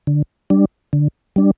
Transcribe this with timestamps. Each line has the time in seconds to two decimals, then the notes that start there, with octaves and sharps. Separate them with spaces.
0.07 D3
0.50 G3 D4
0.93 D3
1.36 G3 D4